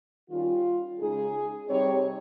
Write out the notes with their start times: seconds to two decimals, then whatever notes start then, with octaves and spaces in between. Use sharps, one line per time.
0.30 D#3 G3 C#4 F4
0.99 C#3 G#3 D#4 G#4
1.68 C3 G3 C4 D#4 C#5